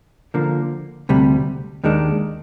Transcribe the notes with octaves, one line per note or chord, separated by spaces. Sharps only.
D3 F3 A#3
D2 C3 G3
D#2 D#3 G#3 D4